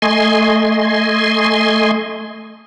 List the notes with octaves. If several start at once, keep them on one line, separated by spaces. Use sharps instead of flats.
A3 D#5 G#5 C6